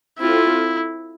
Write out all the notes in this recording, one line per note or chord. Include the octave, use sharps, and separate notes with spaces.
C4 E4 F4 A4